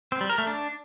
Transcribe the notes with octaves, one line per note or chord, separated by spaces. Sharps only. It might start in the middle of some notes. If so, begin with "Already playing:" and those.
C4
G3
A#4
A3
D4